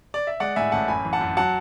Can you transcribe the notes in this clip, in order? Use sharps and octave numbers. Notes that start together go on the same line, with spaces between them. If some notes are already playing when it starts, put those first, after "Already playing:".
D5
E5
G#3 D5 F#5
A2 E5 G#5
A1 F#5 A5
F#2 G#5 B5
E3
F#5 A5
F#2
F#3 F#5 A5